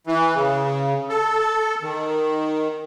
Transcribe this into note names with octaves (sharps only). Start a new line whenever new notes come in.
E3
C#3
A4
D#3